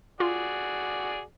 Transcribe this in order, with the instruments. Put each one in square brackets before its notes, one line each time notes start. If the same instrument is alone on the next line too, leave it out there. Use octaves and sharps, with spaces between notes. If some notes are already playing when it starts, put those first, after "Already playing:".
[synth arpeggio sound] F4 [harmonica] F#4 G#4 D5